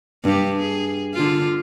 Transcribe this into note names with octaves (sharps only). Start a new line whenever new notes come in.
G2 G4
G#4
D3 F4